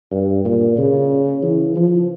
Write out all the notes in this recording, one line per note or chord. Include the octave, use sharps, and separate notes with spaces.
G2
A#2
C#3
E3
F3